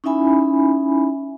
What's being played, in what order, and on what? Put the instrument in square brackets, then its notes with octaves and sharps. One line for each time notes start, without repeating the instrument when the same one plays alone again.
[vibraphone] C#4 D#4 E4 E5 G#5 B5